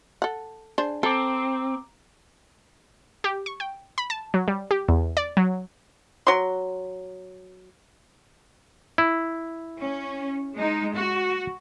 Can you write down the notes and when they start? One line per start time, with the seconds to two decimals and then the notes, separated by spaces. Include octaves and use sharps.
0.22 A4 F#5
0.78 D4 G#4 C5
1.03 C4 A4 A#5 D6
3.24 G4
3.46 C#6
3.60 G5
3.98 B5
4.10 A5
4.34 F#3
4.48 G3
4.71 G4
4.88 E2
5.17 D5
5.37 F#3
6.27 F#3 C6
8.98 E4
9.79 C#4
10.56 G#3 D#4
10.95 F#4